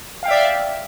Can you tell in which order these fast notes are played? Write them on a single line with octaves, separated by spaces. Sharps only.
F5 G5 E5 D5